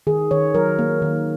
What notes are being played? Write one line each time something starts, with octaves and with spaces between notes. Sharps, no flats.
D#3 G#4
D#3 C#5
F#3 A#4
A#3
D#3